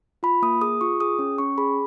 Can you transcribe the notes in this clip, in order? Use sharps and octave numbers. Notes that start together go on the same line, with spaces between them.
F4 B5
A#3 D#6
G#4 D#6
F4 C#6
G#4 D#6
C#4
C#4 C#6
G#4 B5